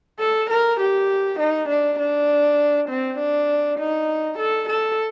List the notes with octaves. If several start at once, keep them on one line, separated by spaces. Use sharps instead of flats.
A4
A#4
G4
D#4
D4
D4
C4
D4
D#4
A4
A4